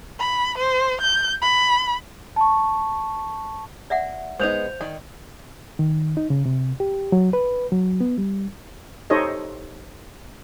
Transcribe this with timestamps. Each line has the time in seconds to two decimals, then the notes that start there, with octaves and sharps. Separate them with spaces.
0.20 B5
0.58 C5
1.01 G6
1.42 B5
2.36 A5 C#6
3.90 D5 E5 F#5
4.40 G#3 B3 D#4 C5 G6 F7
4.81 D#3 D5
5.79 D#3
6.17 D#4
6.30 C#3
6.46 C3
6.80 G4
7.12 F#3
7.33 B4
7.72 F#3
8.01 B3
8.18 G3
9.10 D#4 G4 A4 C5 C#5 D#5